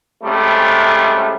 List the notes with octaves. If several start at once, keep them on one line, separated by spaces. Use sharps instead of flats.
C#2 C3 G3 A3